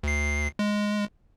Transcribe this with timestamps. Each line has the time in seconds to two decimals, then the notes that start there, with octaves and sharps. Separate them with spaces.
0.03 D2 C7
0.59 G#3